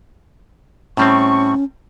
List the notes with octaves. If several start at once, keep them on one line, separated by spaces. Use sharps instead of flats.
A2 G3 C4 C#4 C#6